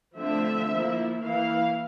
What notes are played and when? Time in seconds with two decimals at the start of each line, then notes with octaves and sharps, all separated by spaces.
0.18 D3 F3 A3 C4 E5
0.71 F3 A#3 E4
1.24 E3 A#3 E4 F5